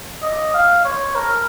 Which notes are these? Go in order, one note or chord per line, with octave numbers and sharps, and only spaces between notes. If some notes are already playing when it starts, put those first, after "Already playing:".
D#5
F5
C#5
A#4